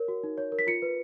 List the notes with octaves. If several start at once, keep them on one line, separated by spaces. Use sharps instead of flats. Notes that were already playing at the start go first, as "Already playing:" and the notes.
Already playing: A#4 C#5
F#4
D#4
C#5
A#4
B6
F4 C#7
B4